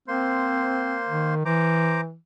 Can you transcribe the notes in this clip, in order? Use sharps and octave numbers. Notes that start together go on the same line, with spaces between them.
A#3 C4 C5 C6
D#3
E3 C5 A#5 D6